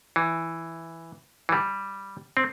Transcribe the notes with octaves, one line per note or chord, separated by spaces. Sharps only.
E3
E3
G3
C4